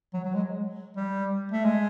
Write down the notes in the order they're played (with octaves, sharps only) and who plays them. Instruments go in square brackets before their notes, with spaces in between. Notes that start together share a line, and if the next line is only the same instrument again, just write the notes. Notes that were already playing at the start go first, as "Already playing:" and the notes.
[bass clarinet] F#3
F#3
G#3
G3
A3
G#3